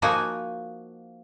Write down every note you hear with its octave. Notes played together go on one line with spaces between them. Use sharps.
F3 A#3 D#4 F#4 G#5